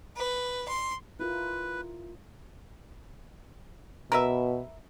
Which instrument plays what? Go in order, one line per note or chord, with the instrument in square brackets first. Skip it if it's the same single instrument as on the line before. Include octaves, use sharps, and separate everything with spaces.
[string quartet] B4
C6
[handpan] E4 F4 A#4 [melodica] B4
[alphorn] B2 [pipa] A#4 B4 E5